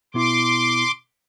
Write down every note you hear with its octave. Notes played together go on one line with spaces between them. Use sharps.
B2 B3 E4 C6 D6